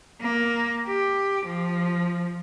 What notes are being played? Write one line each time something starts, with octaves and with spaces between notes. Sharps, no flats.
A#3
G4
F3